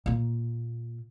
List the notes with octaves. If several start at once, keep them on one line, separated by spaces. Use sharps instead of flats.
A#2 A#3